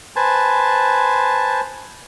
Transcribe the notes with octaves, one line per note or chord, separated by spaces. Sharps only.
B4 C5 G#5 A5